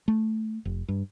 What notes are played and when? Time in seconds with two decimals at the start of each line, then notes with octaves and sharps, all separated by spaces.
0.08 A3
0.65 F1
0.88 G2